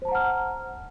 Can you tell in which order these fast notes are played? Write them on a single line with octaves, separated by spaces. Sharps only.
C5 A5 A#5 F#5 F6